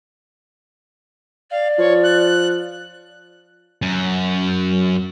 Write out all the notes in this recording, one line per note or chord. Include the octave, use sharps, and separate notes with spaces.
D5 F5
F3 C#5
F#6
F#2